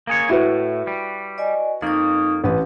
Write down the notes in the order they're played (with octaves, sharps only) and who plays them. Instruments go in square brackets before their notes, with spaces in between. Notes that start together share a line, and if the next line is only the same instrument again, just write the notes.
[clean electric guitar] A#3 G#4 C#5
[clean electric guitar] A2 [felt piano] E4 F#4 B4
[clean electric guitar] G3
[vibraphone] D5 D#5 G#5
[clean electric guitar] F2 A#3 [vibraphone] D#4 C#6 D#6
[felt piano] A1 B4